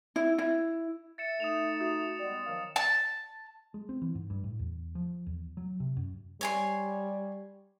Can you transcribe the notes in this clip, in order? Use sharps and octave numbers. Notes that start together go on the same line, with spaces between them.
E4
E4
E5 A6 C#7 E7
A3 D#4 D#6 E7 F7
F#4 D#6
G3 G#3 B3 D5
D#3 F3 F#3 F5
A5
G#3
C4
E3
G#2
G2
A2
E2
F3
E2
F#3
C3
F#2
G3 C#5 G#5 C6